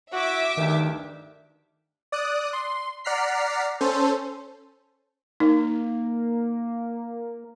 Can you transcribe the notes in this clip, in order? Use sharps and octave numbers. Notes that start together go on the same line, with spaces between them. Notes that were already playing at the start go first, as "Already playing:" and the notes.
E4 F#4 E5 D6
D2 G2 D#3
D5 D#6 F#6
C6
D5 F#5 A#5 F6 B6 C7
C#4 A4 C5
A#3 D#4